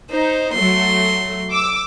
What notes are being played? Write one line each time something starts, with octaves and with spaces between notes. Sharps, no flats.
D#4 C5
F#3 A3 C6
D6 E6